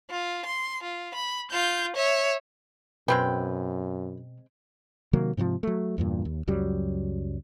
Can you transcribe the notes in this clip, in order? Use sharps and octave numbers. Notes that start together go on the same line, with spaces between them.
F4
C6
F4
B5
F4 G6
C#5 E5
F#2 B2 G#3 C4 B4 G5
C3 D#3 F#3 A#3
G#2 C3 D#3 F3
F#3 A3
E2 G2 A#2
D#2
C#2 F#2 F#3 G3